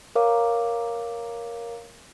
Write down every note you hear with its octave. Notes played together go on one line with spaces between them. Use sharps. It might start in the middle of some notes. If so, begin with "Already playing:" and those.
A#4 C#5 F5 A#5 D6